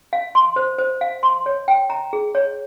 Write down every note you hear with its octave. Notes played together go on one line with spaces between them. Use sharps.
F5
C6
C5
C5
F5
C6
C#5
G5
A#5
G#4
C#5